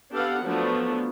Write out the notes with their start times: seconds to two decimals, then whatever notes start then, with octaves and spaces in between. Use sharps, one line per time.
0.12 B3 D4 G4 A4 F5 F#5
0.44 F3 F#3 A3 B3 D4